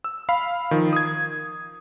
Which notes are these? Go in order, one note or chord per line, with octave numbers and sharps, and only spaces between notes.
E6
F5 B5
D#3 F3
D#6 G#6